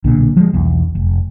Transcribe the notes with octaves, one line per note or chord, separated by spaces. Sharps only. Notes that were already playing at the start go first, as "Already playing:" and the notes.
B1 A#2 D3
F3 F#3 G#3
B1 E2
F1